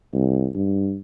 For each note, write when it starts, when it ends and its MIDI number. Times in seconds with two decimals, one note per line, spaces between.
0.14 0.49 36
0.55 1.00 43